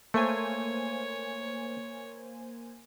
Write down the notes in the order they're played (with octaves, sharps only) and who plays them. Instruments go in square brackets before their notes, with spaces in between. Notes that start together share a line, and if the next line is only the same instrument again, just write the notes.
[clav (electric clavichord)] A3 [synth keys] A#3 C5 G#5 [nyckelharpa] C#5